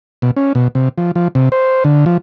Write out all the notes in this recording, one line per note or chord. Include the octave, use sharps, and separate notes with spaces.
B2
C#4
B2
C3
F3
F3
C3
C5
D3
F3